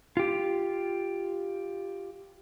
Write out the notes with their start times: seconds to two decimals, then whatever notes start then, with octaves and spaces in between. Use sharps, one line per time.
0.17 F4 G4